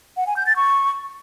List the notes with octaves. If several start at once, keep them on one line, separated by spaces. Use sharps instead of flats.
F#5
G#5
G6
A6
C#6